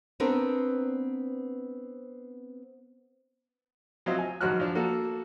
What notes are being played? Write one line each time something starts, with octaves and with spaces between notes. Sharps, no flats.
B3 C4 D4 A#4 B4
F#3 C4 F4 C5 D#5 E5
G#5
G#1 F#2 D#4 F#4 F6 F#6
F3 D4
A#3 F#4 A4